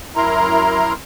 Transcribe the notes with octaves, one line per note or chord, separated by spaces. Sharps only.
F#2 E4 A#4 A#5 C6